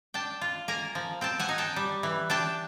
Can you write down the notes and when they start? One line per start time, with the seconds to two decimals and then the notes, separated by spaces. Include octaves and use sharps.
0.14 D4 G5 A5
0.41 F4
0.68 A#3 G#5 A#5
0.95 F3
1.21 C4 G5 A5
1.39 F#5 G#5
1.49 D#4
1.58 G5 A5
1.76 G3
2.03 E3
2.30 D4 G5 A5